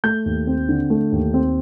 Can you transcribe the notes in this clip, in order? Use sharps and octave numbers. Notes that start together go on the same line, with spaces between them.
A3 G6
D#2
C4
D3
A3
D#2
C4